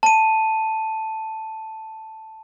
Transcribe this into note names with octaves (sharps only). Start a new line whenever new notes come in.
A5 D#7